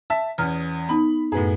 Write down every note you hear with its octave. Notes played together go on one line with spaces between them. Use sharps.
E5 A5
E2 C#4 F6
B3 D#4 B5
F#2 A2 B3 G#4